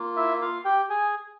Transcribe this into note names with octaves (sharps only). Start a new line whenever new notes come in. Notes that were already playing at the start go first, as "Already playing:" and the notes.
Already playing: A#3 F4
E4 E5
F4 F5
G4 G5
G#4 G#5